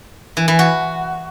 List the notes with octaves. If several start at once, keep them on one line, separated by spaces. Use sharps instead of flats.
E3
E3
F#4